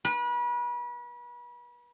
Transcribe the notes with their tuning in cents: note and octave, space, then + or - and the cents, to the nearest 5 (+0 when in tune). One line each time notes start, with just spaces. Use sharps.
B4 -35